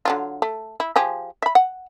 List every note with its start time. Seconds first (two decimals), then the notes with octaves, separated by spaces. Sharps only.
0.05 D3 F#3 F4
0.42 A3
0.80 E4
0.96 F3 G4 G#4
1.42 E5 B5
1.55 F#5